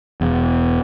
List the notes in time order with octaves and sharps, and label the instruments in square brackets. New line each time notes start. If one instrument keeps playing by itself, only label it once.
[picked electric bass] E1 E2